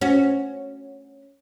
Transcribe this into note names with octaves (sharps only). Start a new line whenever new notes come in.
C#4 F#4